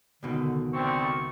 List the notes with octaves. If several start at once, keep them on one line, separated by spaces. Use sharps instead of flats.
C#2 B2 D3 D#3
D2 C4 C#6